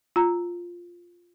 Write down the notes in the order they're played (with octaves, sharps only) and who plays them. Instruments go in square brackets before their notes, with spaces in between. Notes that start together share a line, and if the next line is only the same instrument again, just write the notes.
[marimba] F4 A#5